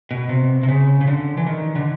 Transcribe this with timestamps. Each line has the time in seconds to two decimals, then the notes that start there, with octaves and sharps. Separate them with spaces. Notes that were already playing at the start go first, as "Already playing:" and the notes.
0.11 B2
0.29 C3
0.63 C3
0.68 C#3
1.01 C#3
1.07 D3
1.37 E3
1.47 D#3
1.76 D3